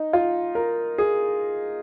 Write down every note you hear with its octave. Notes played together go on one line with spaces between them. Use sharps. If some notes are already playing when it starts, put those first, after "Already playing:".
Already playing: D#4
F4
A#4
G#4